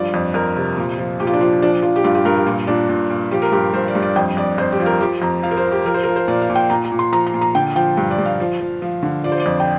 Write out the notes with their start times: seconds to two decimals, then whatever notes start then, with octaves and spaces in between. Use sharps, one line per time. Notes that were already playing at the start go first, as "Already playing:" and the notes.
Already playing: G2 F3 D5
0.14 F2
0.34 F2 A#4
0.56 C3
0.78 A#2
0.98 F3
1.20 A#2 G4
1.27 F4
1.34 D4
1.41 F3 F4
1.62 F3 D4
1.82 F3 F4
1.96 G4
2.04 G2 F4
2.15 G4
2.25 G2 A#4
2.36 G4
2.46 A#2 F4
2.67 A#2 D4
2.89 A#2
3.10 A#2
3.31 F3 G4
3.42 A#4
3.52 G2 G4
3.73 G2 C5
3.88 D5
3.95 G2
4.03 D5
4.16 F2 G5
4.37 F2 D5
4.58 F2 C5
4.72 G4
4.79 F3
4.86 A#4
5.01 F3 G4
5.22 F2 A#5
5.43 F3 F5
5.51 A#4
5.57 C5
5.64 F3
5.72 G4
5.86 F3 A#4
5.94 C5
6.03 A#4
6.07 F3
6.16 C5
6.28 A#2 D5
6.42 F5
6.50 A#2
6.55 G5
6.70 A#2 A#5
6.85 A#5
6.92 A#2
6.99 C6
7.12 F3 A#5
7.27 A#5
7.34 A#2
7.41 A#5
7.55 D3 G5
7.76 F3 G5
7.97 G2
8.11 D5
8.19 G2
8.26 F5
8.40 F3
8.60 F3
8.82 F3
9.03 D3
9.24 F3 D5
9.32 C5
9.40 D5
9.46 F2
9.60 G5